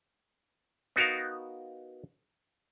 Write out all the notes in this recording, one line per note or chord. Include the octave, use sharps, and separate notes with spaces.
B3 D#4 F#4 A#4 F5